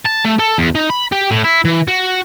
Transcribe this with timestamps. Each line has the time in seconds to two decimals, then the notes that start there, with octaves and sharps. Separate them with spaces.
0.06 A5
0.25 A3
0.40 A4
0.58 E2
0.75 D#4
0.90 B5
1.12 G4
1.31 A2
1.44 E4
1.65 E3
1.88 F#4